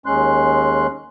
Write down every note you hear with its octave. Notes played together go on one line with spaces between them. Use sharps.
D#2 G#3 C#4 C6 F#6